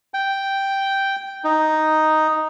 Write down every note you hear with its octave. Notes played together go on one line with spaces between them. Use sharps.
G5
D#4